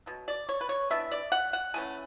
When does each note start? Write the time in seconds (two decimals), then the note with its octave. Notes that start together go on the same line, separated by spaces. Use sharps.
0.06 B2 F#3
0.28 D5
0.49 C#5
0.61 B4
0.69 C#5
0.90 E3 B3 D4 E5
1.11 D5
1.32 F#5
1.53 F#5
1.74 E3 A3 C#4 G#5